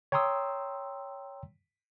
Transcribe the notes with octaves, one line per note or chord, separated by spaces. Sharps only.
C#5 G5 A#5 C6 D#6 E6